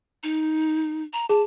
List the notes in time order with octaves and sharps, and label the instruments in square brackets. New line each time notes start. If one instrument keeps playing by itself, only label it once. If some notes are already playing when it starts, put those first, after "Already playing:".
[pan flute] D#4
A#5
[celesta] G#4 [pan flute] A5